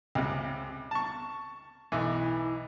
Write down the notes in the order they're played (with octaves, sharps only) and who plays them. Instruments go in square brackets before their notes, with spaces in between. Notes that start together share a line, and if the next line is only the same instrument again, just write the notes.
[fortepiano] C#2 C3
A5 C#6
[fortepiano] B1 E3 [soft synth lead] E4